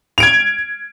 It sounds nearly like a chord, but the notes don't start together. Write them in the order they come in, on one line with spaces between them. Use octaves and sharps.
F7 D7 G#6